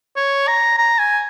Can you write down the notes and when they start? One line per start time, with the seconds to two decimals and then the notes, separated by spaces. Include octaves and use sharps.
0.16 C#5
0.47 A#5
0.78 A#5
0.98 G#5